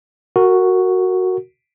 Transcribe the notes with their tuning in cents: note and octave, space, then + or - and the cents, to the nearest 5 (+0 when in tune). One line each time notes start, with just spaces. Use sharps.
F#4 +0 A#4 -20